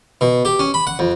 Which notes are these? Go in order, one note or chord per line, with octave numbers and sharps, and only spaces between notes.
B2
G4
C#4
B5
F#5
F2